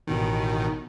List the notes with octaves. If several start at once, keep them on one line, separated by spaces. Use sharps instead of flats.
A1 B2 D#3